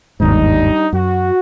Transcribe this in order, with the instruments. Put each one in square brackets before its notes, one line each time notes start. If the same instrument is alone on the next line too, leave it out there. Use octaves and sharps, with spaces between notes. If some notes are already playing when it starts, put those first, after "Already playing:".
[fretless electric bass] G1 D#2 G#2 [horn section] G3 D4 D#4
[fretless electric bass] F#2 [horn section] F#4